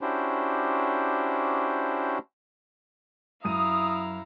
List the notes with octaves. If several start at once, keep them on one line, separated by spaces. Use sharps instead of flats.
C#4 D4 E4 F#4 G4 C5
F#2 E4 F5 A#5 D#6 D#7